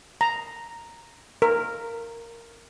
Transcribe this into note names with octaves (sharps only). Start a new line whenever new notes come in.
A#5
A#4